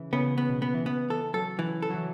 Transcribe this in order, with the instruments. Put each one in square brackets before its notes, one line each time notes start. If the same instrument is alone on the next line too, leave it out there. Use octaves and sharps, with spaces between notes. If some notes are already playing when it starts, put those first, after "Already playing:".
Already playing: [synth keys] C#3 E3
[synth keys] C#3 [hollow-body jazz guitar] B3
[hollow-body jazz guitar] B3
[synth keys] B2
[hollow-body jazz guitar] B3
[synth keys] E3
[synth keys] C#3 [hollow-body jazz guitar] B3
[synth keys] E3 [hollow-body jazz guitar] A4
[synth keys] F#3 [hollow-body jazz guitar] A4
[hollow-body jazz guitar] E3 [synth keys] F#3
[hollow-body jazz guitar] A4
[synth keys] F#3
E3